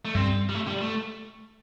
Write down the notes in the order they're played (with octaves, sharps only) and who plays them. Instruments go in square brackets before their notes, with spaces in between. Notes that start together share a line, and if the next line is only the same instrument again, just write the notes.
[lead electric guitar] A3
[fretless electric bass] G2 G3 [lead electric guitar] C4
[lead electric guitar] G3
A3
G3
A3